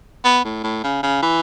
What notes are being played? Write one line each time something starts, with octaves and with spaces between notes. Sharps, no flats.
B3
A2
A2
C#3
C#3
E3